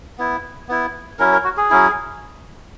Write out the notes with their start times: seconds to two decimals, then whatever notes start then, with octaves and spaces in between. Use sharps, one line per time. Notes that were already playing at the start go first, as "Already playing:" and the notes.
0.18 B3 E4
0.69 B3 E4
1.19 F#3 C#4 E4 A#4
1.33 A#4
1.44 F#4
1.57 G#4
1.70 F#3 C#4 E4